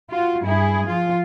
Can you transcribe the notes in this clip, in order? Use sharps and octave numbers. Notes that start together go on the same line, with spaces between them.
F4 F#4
G2 E4 G#4
F3 F4